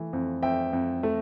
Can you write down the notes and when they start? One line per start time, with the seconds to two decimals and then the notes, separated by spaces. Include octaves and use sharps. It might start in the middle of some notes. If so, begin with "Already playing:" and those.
Already playing: E3 A3
0.13 F2
0.43 F2 E5 G5
0.73 F2
1.03 A3